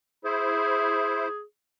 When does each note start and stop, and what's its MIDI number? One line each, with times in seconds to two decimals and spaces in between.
0.24 1.28 64
0.24 1.43 68
0.24 1.28 72